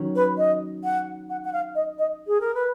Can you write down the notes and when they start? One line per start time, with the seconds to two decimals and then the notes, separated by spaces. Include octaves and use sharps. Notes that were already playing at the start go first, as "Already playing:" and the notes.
Already playing: D#3 F#3 C#4
0.16 B4
0.38 D#5
0.84 F#5
1.30 F#5
1.45 F#5
1.53 F5
1.75 D#5
1.99 D#5
2.27 G#4
2.41 A#4
2.55 B4